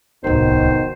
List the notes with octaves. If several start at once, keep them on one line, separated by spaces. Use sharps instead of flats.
D1 C2 B2 D#3 C5